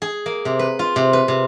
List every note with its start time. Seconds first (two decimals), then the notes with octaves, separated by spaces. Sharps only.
0.02 G#4
0.26 A#3
0.45 C3
0.59 B4
0.79 F4
0.96 C3
1.13 B4
1.28 C3